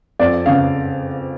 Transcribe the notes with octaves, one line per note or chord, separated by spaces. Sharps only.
F2 D5
C#3 F5